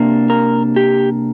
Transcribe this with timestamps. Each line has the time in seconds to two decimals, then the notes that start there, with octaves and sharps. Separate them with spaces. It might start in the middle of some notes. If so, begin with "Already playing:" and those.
Already playing: C3 A#3 D4
0.30 A#4
0.76 G4